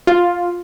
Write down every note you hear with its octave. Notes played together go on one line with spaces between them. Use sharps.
F4